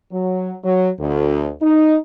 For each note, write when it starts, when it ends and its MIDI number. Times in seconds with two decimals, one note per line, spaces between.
0.12 0.54 54
0.64 0.89 54
1.00 1.50 38
1.62 1.96 63